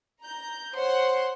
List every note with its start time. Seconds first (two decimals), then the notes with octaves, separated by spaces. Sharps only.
0.23 A#5 G6
0.74 C5 C#5 F#5 C6